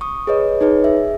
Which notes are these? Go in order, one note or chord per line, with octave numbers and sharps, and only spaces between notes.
C#6 D#6
G#4 B4 C#5 D#5
D#4 G#4 B4 C#5
G#4 E5